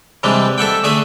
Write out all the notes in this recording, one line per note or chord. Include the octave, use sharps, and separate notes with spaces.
C3 E3 G3 G#3 D4
A4 E5 F#5 G5
D3 A3 G#4 E5 G#5